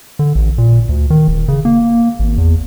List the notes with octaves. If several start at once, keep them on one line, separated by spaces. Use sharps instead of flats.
D3
A1
A#2
D2
D#3
D#1
C#3
A#3
G#1
E2